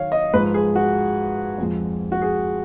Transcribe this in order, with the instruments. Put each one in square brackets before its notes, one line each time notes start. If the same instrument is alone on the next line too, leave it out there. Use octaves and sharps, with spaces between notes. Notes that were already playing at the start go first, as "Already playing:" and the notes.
Already playing: [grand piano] D#3 F#3 C#5 F5
D#5
G#2 F3 G#3 B4
G#4
F#4
F2 F3 G#3
F#4
G#4